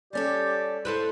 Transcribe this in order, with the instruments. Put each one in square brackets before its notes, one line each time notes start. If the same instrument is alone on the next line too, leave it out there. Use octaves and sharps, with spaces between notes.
[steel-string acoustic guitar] G3 C#4 A4 [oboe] G4 [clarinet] D5
[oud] A3 E4 B4 [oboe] C5